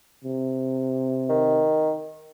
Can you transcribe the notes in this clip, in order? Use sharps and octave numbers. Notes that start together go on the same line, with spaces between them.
C3
D#3